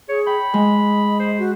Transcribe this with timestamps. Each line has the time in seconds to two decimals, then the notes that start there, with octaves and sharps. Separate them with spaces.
0.09 G#4 C#5
0.27 G5 B5
0.54 G#3 D#5
1.19 C5
1.38 F#4